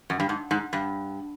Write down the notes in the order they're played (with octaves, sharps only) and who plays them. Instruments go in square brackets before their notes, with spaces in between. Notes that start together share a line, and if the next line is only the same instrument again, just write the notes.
[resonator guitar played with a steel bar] F#2
G2
G#2
G#2
G2